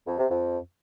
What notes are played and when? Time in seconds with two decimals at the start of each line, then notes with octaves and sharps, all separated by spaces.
0.07 F2
0.18 C3
0.30 F2